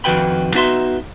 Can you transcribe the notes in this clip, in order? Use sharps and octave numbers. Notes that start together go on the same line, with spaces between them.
F2 D#3 F#4 B4 G5 B5
B3 D#4 F#4 E5 A5 C6